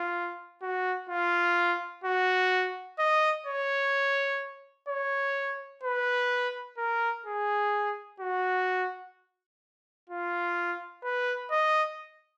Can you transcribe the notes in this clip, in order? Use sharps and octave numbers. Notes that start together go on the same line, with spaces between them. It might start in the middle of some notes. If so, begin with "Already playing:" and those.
Already playing: F4
F#4
F4
F#4
D#5
C#5
C#5
B4
A#4
G#4
F#4
F4
B4
D#5